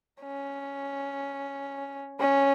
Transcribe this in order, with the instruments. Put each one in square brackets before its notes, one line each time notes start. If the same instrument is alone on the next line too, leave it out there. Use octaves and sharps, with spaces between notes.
[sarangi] C#4
C#4